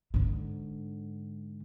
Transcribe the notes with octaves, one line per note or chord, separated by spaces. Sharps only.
G#2 D3